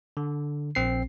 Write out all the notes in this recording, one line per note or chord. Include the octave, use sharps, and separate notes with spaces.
D3
A#1 C4 C7